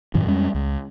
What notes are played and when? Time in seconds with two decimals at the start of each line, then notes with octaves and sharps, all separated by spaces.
0.14 F#2 A2 D#3 F#3
0.26 F2 G3 G#3 C#4
0.55 C#2